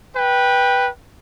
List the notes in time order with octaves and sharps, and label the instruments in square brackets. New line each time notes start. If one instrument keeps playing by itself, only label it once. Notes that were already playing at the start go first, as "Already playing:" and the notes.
[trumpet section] B4 G5